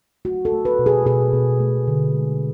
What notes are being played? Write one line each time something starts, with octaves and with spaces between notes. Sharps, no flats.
A3 F#4
A4
A3
B4
B2
G#4
B2 G#4
B2
A3
D3
G#3